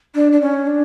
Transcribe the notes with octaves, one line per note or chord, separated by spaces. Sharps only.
D4
D4
C#4
D4